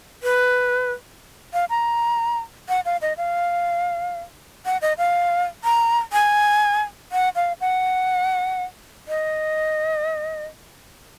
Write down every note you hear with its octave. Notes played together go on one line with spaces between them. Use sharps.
B4
F5
A#5
F#5
F5
D#5
F5
F#5
D#5
F5
A#5
G#5
F#5
F5
F#5
D#5